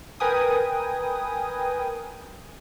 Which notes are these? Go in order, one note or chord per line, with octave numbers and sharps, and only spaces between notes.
A#4 B4 G5 G#5 D#6